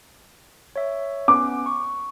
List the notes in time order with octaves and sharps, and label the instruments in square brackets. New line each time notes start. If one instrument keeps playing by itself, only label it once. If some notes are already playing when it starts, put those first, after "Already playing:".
[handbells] C#5 E5
[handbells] B3 C#4 B4 [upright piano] D6
[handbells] C#6